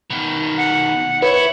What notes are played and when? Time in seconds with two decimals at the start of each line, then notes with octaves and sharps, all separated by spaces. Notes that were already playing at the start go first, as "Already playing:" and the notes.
0.10 B2 D#3
0.58 F#5
1.22 E4 B4 C#5